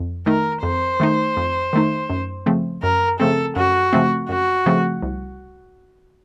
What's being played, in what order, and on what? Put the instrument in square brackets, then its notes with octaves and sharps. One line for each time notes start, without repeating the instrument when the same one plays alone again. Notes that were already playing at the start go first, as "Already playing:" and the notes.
Already playing: [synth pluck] F2
[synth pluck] D#3 A3 D#4 [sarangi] A#4
[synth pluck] F2 [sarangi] C5
[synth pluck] D#3 A3 D#4
F2
D#3 A3 D#4
F#2
C#3 F3 A3 C4
[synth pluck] F#2 [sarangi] A#4
[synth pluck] C#3 F3 A3 C4 [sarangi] A4
[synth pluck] F#2 [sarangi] F#4
[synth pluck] C#3 F3 A3 C4
[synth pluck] F#2 [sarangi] F#4
[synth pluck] C#3 F3 A3 C4
C2